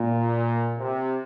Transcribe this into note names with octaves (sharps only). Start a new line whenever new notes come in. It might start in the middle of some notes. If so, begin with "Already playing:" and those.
Already playing: A#2
C3